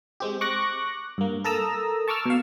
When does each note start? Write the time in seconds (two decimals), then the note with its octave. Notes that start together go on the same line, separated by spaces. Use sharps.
0.20 G#3 C4 G4
0.41 C#6 D6 F#6 A#6
1.18 G2 A#3
1.44 A4 A#4 A5 A#5 D#6 E6
2.08 A5 C#6 D6 E6 F6
2.26 B2 F5